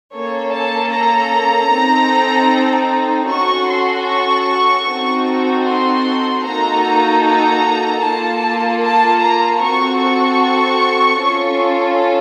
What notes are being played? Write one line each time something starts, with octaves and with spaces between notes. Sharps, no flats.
A#3 C#4 A4 C#5
A5
A#5
C4 D#4 A4
C#4 F#4 A4 C#6
C6
C#6
C4 D#4 F#4 A4
C6
A#3 D#4 F#4 A4 A#5
A#5
A#3 F4 A4 A5
A5
A#5
C4 F#4 A4 C#6
C#6
C#4 F4 A4